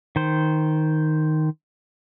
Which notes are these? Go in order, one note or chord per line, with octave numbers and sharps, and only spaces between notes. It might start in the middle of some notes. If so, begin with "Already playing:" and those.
D#3 C5